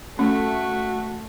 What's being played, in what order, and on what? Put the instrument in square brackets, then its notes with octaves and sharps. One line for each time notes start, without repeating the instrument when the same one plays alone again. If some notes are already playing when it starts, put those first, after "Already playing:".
[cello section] A3 [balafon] C#4 [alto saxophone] F#4